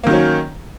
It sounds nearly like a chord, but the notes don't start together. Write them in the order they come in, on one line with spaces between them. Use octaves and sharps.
A#3 D#3 F#3 C#4